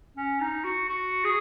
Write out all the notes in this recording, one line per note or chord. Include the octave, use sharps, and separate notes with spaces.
C#4
D#4
F#4
F#4
G#4